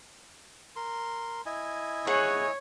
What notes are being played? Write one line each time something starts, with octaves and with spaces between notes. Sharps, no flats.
A#4 C6
E4 D#5 G#5
G#4 C#5 F#5 C#6